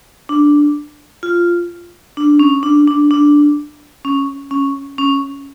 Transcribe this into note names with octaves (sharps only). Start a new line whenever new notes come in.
D4
F4
D4
C#4
D4
D4
D4
C#4
C#4
C#4